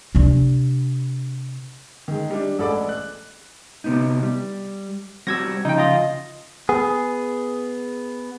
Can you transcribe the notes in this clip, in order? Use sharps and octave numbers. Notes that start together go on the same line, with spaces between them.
C3 D4
D#3 G#3
G3 D4
A1 G#3 A4 D5 B5 D6
F#6
C3 B3 D#4
G3
G3 C4 F#4 E6 G#6 A#6
C#3 F3 D#4 G5
F4 D#5
B3 G#4